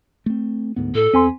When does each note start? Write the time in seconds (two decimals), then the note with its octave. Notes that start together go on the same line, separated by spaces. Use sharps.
0.26 A3 C4
0.76 D2 G#2 B3
0.95 A2 A4
1.14 E2 C4 G#5 C6